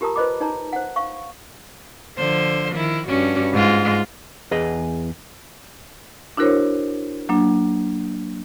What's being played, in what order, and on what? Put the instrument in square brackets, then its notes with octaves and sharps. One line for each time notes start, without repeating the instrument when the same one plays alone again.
[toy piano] F4 G4 A#4 A5 A#5 D#6
F4 B4 C5 D#5 B5 D6
D#4 C#5 A5 A#5
C5 F#5
F5 C#6
[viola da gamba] D3 F3 C5
D#3 E4
G2 C#4 F#4
G#2 G#3 F4
[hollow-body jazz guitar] E2 G#4 B4 D#5
[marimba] D4 E4 F#4 A#4 C5 C#5
F#3 A#3 D4